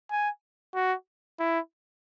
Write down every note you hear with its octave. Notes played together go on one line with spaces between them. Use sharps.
G#5
F#4
E4